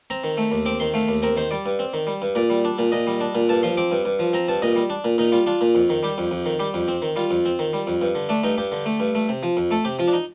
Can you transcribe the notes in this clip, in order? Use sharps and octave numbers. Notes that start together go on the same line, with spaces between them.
C4 A#5
D#3
A3
D#2
C4 D6
D#3 C6
A3 F5
D#2
C4 A#4
D#3 C5
G3 D5
G2
C4
D#3
G3
G2
A#2 D5
G3
D4
A#2
A#2 D#5
G3
D4
A#2
G2 A5
F3 C6
C4 D6
G2
G2
F3
C4 A#5
G2 A5
A#2 D#5
G3
D4
A#2
A#2 D#4
G3 F4
D4 F4
A#2
F2
D#3
G3 G4
F2
F2
D#3
G3 G4
F2
C4
D#3
G3 F4
F2
C4
D#3
G3
F2
G2
D3
A3 D4
G2 D#4
G2 G4
D3
A3
G2
A3
C3
F3
F2
A3 A4
C3 G4
F3 F4
D4
D#4